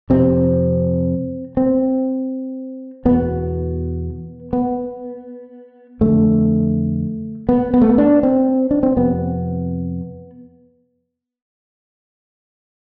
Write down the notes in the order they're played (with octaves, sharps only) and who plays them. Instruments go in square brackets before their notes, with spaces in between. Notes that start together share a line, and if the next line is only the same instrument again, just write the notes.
[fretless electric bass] F2 C3 C4
C4
E2 B2 B3
B3
F2 D3 A3
B3
B3
A3
B3
D4
C4
D4
C4
F2 C3 B3